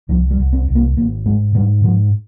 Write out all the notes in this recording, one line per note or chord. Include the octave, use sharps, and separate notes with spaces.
C2 F3
G3
C2
C4
C2
A#3
G#1 A#3
G#2 G#3
G#2 G3
G#2 F3